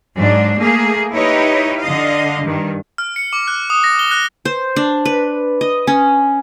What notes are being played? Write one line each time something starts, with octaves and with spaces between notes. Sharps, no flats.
G#2 F#3 D4
A3 A#3 G#4
D#4 E4 G4 B4 C#5 D#5
D3 D#5 F5
G2 D#3
F6
C#7
D6
F#6
D#6
A#6
G7
F#6
C5
D4
B4
D#5
C#4